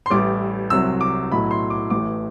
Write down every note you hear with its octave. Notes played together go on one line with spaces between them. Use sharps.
C6
A1 A2 E3 G3 D6
C2 C3 F#3 E6
D6
B1 A2 F#3 B5
C6
D6
A1 A2 E3 D6